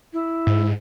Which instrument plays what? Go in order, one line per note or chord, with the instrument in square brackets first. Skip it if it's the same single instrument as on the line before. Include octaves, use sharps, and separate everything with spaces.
[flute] E4
[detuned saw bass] G#2